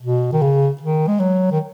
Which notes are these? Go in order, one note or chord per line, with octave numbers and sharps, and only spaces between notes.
B2
D#3
C#3
D#3
G#3
F#3
D#3